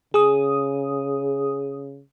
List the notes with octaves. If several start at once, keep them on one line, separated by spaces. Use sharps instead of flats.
C#3 G#4 D#6